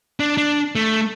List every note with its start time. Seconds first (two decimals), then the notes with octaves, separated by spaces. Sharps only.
0.20 D4
0.37 D4
0.75 A3